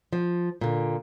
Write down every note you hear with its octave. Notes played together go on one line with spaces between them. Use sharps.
F3
A#2 D3